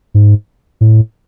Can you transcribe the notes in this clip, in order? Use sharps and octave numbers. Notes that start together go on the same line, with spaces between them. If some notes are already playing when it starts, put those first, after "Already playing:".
G#2
A2